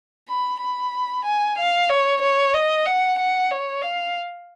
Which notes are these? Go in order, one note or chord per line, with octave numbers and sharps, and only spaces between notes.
B5
B5
G#5
F5
C#5
C#5
D#5
F#5
F#5
C#5
F5